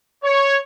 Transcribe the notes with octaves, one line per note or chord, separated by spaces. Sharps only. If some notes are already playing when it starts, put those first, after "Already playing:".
C#5